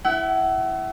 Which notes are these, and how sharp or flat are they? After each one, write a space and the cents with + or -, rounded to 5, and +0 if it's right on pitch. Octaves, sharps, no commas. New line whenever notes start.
E4 +0 F#5 +35